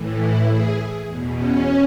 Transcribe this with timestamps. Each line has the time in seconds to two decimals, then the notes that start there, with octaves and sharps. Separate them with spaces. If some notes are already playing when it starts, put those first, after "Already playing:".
Already playing: A2 E3
0.18 E4
0.47 G#4
1.06 E2 B2
1.34 C#4